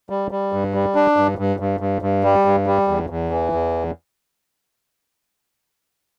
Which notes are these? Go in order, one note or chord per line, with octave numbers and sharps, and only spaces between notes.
G3
G3
G2
G3
D4
G2
G2
G2
G2
G2
G3
G2
G3
E2
E2
E3
E2